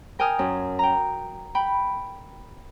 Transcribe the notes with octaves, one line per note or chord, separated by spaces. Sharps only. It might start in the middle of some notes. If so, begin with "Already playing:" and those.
A#4 G5 G#5 D#6 F6
F#2
G5 A#5
G5 B5